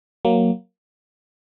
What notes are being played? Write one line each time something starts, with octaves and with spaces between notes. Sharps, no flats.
F#3 A#3